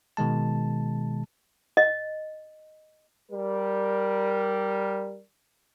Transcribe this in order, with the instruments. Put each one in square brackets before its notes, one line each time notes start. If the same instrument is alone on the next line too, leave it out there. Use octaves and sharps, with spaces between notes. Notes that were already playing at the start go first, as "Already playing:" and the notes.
[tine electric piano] B2 D#3 G#3 A5
[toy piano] D#5
[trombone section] G3 A#4